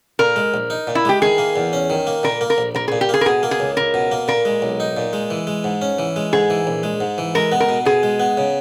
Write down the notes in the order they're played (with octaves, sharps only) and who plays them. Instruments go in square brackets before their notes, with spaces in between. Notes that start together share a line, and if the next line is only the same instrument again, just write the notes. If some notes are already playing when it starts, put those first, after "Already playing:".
[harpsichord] A#2 [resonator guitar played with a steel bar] A#4
[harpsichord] G#3
A#1
D#4
A#2
[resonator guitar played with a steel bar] E4
[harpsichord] G#3 [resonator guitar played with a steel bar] G4
[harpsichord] D#3 [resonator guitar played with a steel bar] G#4
[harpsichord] A#3
E2
C#4
D#3
A#3
[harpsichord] A#2 [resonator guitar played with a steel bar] A#4
[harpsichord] A#3
[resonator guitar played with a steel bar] A#4
[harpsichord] A#1
[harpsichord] A#1 [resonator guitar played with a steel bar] A#4
[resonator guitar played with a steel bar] G#4
[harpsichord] A#2
[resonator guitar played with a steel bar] G4
[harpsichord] A#3 [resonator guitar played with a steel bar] G#4
[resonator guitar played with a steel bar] A#4
[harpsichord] B2 [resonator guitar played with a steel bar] G#4
[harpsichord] A#3
[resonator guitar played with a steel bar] G#4
[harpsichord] C#2
[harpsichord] C#2 [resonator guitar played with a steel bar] A#4
[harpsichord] B2
A#3
[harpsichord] A#2 [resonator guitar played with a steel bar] A#4
[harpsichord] G#3
B1
D#4
A#2
G#3
E3
G#3
G#2
C#4
E3
G#3
[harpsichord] G#2 [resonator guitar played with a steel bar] G#4
[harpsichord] E3
A#1
G#3
G#2
E3
[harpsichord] G#3 [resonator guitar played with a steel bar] A#4
[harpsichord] B3
[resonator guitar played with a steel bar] A#4
[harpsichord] B2
[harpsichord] B2 [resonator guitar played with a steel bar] G#4
[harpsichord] G#3
B3
C#3